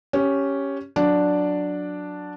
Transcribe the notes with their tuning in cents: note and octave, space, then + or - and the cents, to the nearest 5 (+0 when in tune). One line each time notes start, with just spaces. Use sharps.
C#4 +0 G4 +0
F#3 -15 D4 +0 D5 +0